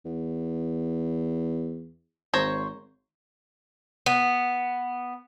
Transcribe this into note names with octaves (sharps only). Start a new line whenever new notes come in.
E2
G#1 C5 C#5 A#5
B3